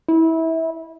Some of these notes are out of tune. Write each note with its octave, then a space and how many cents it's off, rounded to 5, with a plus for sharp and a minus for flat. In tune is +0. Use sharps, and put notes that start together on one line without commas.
E4 -25